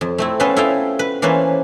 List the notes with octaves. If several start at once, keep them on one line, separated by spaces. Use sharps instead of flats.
F2
A3 C4 E4
B3 C#4 F4 A4 B4 C5
E4 F4 A4 D#5 F5 G5
B4
E3 A#3 C#4 A4 B4 C5